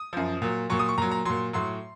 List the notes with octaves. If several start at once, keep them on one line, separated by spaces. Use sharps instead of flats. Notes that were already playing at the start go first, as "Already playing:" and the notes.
Already playing: D#6
F#2 F3
A#2 F#3
A#2 F#3 C#6
D#6
C#6
A#2 F#3 A#5
A#5
A#2 F#3 C6
A2 F#3 C6